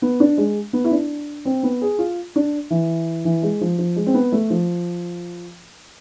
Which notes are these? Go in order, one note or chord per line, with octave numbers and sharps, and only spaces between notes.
B3
D4
G#3
B3
E4
D4
C4
B3
G#4
F4
D4
E3
E3
G#3
F3
F3
G#3
C4
B3
A3
F3